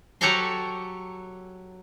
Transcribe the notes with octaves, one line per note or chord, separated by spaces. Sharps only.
F#3 G4 A4 C#5 A#5 C6